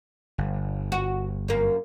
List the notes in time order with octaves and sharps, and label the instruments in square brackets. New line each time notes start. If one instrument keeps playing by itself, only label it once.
[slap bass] G1
[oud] F#4
F#2 A#3